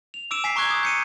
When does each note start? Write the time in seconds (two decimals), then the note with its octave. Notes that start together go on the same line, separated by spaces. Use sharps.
0.14 F7
0.31 D6 E6 D7 E7
0.44 G#5 B6 C7
0.56 A#5 C#6 D6 F#6 G#6 G7
0.70 D#6 G#6
0.83 G6 C#7 D#7